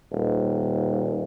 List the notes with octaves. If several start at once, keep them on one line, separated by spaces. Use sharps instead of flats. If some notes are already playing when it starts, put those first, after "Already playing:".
D#1